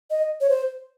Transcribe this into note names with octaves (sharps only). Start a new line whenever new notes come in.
D#5
C#5
C5